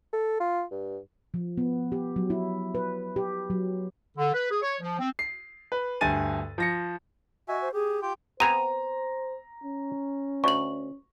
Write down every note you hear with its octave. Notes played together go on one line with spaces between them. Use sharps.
A4
F4
G2
F3
B3
G4
F#3
E4
B4
G4
F#3
D3
B4
G#4
C#5
F3
C4
C7
B4
D2 G2 G#5 A6 D#7
F3 A#6 C#7
F#4 D#5 E5 G#5
C5
G4 G#4
F4 G4 G5
B3 C4 C5 G#5 A#5 D#7 F7
C#4
D2 C#6 F#7